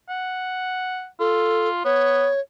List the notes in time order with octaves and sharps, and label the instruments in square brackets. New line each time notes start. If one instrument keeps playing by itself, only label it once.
[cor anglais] F#5
[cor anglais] F4 [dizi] A4
[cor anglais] B3 [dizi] C#5